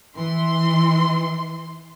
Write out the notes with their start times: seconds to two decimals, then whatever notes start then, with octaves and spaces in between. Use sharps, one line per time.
0.15 E3 C6